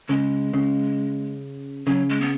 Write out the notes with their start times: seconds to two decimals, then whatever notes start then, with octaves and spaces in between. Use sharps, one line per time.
0.08 C#3 G#3
0.53 C#3
1.87 C#3 F#3
2.09 G#3
2.21 B3